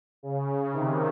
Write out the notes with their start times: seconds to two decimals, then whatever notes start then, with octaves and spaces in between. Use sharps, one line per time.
0.23 C#3
0.73 C3 D#3